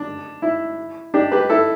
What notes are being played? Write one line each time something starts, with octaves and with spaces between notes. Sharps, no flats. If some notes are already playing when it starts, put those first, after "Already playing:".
Already playing: D4
E4
D4 G4
G4 B4
E4 A4